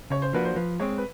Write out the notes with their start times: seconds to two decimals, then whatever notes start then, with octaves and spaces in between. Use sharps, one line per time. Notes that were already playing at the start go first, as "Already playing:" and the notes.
0.10 C#3 C#5
0.22 C5
0.33 F3 A#3 D4 F#4 B4
0.45 C5
0.56 F3 B4
0.80 G#3 C4 C#5
0.98 B4